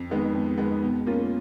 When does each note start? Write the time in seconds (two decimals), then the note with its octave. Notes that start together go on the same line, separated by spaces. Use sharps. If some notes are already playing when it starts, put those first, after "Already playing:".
Already playing: F2
0.10 D#3 G#3 B3
0.34 F2
0.58 D#3 G#3 B3
0.82 B2
1.07 A#3 C#4 F4